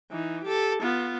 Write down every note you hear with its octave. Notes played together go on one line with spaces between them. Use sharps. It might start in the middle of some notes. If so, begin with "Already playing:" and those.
E3 D#4
G4 A4
B3 F4